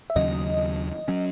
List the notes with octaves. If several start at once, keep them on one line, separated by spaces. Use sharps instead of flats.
E5
D#2 C#3 F#3 D#5
F#3 C#4